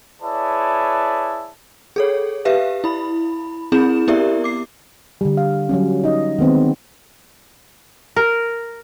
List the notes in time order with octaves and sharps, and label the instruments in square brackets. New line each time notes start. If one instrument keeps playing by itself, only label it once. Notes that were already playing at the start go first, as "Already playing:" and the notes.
[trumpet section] E4 G#4 B4 C#5 D5 A5
[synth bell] G#4 A4 C#5
G4 B4 E5 F5
E4 B5
C4 E4 G#4 B5 G6 E7
B3 E4 G4 A#4 D5 E5
D6 C7
[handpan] D3 G3
F5
F#3 G3 C#4
D#4 D#5
D#3 G#3 B3 C4
[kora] A#4